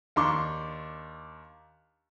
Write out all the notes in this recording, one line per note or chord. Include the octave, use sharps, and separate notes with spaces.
D#2 D4 C6 C#6